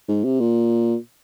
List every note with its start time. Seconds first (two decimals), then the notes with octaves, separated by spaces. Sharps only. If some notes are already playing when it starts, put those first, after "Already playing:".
0.08 G#2
0.24 C3
0.40 A#2